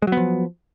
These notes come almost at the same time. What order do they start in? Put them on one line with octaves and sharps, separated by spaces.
G#3 F#3 B3 F3